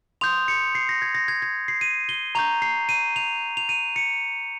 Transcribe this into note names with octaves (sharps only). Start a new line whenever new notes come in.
C6 D#6 G6 F7
C#7
C7
A#6
G#6
A#6
G#6
G#6
C7
D#7
G7
A#5 C#6 G6 F7
C7
D#7
F7
F7
D#7
C#7